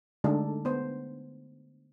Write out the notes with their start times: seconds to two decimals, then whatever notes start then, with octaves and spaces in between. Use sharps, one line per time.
0.24 D3 G#3 A3 D4 D#4 A4
0.65 B3 C5